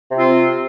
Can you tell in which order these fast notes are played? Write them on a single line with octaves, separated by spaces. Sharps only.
C3 C4 F4